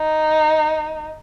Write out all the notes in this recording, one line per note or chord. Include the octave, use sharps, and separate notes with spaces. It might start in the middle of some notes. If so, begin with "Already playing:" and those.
Already playing: D#4